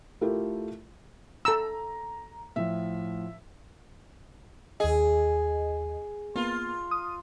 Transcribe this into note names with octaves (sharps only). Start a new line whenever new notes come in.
A3 E4 F4 G4 A4 A#4
A4 A#5 E6
A2 F3 E5
D#2 G#4 D#5
A#3 B3 F4
D#6